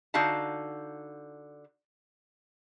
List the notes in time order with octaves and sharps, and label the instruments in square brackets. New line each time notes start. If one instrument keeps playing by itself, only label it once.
[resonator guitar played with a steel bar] D3 D#4 F#4 F5 A5